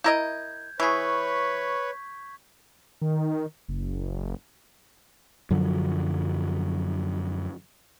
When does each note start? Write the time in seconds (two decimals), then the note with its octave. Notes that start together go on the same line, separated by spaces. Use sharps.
0.04 E4 A#4 D#5 G6 G#6
0.80 E3 G#4 B4 C#5 C#6 G#6 B6
3.01 D#3
3.68 F#1
5.51 F#2 D3 F3 F#3